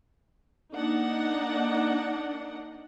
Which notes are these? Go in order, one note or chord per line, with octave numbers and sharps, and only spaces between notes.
A#3 D4 D#4 F#5